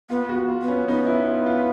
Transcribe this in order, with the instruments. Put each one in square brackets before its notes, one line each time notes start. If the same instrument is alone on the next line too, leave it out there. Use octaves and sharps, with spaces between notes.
[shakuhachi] B3 [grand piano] F4
[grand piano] F#4
F4
[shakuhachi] B3
[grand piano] C#4
[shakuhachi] B3 [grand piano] D#4
[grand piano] E4
F4
F4